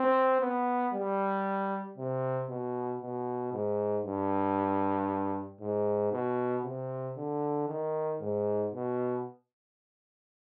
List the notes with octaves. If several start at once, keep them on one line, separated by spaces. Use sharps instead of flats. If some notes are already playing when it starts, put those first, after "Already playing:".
Already playing: C4
B3
G3
C3
B2
B2
G#2
G2
G#2
B2
C3
D3
D#3
G#2
B2